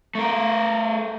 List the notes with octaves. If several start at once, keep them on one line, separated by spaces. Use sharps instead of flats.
A3 A#4